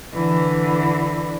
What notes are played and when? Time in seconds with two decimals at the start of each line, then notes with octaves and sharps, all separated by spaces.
0.13 D3 E3